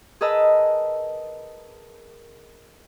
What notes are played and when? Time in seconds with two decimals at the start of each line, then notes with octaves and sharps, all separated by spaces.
0.21 G#4 A#4 B4 D#5 A5 E6